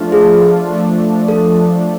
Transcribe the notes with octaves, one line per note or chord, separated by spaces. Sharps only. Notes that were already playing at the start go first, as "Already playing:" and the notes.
Already playing: F3 A3 D4 F4
G#4
F3 A3 D4
A4